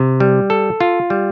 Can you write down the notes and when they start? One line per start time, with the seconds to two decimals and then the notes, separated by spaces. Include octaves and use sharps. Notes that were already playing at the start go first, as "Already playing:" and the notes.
Already playing: C3
0.20 G3
0.50 A4
0.81 F4
1.10 G3